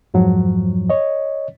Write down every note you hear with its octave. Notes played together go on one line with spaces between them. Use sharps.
F2 G#2 F3 F#3
C#5 D#5